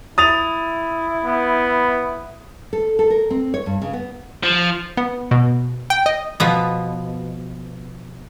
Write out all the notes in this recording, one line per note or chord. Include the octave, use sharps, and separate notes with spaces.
E4 D#6 A6 F7
B3
A4
A4
A#4
C4
C#5
G2
C#3
B3
F3
B3
B2
G5
D#5
B2 F3 B3